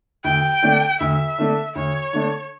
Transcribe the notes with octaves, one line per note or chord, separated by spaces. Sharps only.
D2 G5
D3 A3 D4
D2 E5
D3 A3 D4
D2 C#5
D3 A3 D4